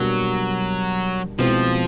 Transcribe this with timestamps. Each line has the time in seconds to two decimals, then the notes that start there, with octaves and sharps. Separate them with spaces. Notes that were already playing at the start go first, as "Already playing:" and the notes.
Already playing: B2 F#3 G3 A#3 D4
1.39 B2 F3 G#3 C4 E4